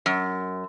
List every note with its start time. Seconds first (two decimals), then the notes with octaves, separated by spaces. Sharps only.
0.06 F#2